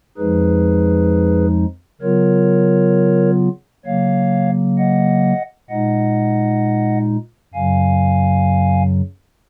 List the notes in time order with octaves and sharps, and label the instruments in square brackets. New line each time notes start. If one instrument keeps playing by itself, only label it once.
[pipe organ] F2 F3 G#3 D#4 G#4 B4
C#3 F#3 B3 F4 A#4 C#5
C#3 F#3 A#3 C#5 F5
D#5 F#5
A#2 G#3 D#4 D#5 F#5
F#2 C#3 F#3 F5 G#5